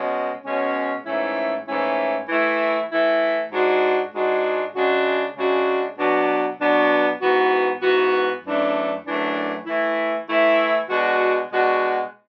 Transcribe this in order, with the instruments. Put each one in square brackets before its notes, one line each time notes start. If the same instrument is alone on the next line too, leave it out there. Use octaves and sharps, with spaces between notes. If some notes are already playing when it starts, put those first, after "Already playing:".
Already playing: [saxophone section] B2 G#3 C#4
B2 G#3 C#4
G#2 E3 A3 C#4 E4
G#2 E3 A3 C#4 E4
E3 A3 E4
E3 A3 E4
G#2 G#3 D4 F#4
G#2 G#3 D4 F#4
C#3 G#3 D4 F#4
C#3 G#3 D4 F#4
B2 F#3 B3 D4
B2 F#3 B3 D4
G#2 E3 B3 F#4
G#2 E3 B3 F#4
F#2 E3 A3 D4
F#2 E3 A3 D4
E3 A3 E4
E3 A3 E4
B2 G#3 D4 F#4
B2 G#3 D4 F#4